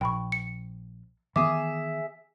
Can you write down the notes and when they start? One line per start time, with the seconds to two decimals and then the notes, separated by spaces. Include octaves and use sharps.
0.01 A#1 G5 B5 C#6
0.32 C#7
1.36 D#3 E3 B3 G#4 E5 D6 D#6